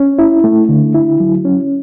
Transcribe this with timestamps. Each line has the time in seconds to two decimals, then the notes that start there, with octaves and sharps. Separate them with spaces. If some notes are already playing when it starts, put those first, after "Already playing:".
Already playing: C#4
0.19 E4
0.44 A3
0.69 D3
0.94 E4
1.20 F#3
1.45 C#4